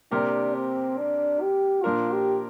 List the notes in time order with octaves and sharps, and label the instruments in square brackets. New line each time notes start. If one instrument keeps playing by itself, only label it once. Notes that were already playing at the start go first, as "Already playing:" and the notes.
[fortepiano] C3 A#3 G4 A#4 [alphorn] D4
[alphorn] C4
D4
G4
[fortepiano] A#2 F3 D4 A#4 [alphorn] F4
[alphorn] G4